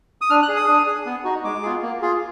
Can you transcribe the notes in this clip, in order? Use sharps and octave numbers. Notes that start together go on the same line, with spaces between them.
D#6
D4 F6
F#6
G#4
D#6
D4
G#4
B3
D#4 F#4
G#3 D6
B3 F4 G#4
A#3
F4 G#4